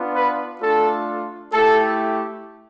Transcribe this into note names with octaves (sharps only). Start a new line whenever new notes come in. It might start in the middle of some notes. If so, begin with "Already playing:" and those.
Already playing: B3 D4 F4
B4
A3 D4 F4 A4
A3 E4 G4 A4